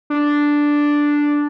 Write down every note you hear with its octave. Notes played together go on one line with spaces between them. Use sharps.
D4